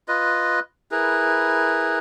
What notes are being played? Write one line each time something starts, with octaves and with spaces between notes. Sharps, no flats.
F4 B4 D#5
E4 G#4 A#4 B4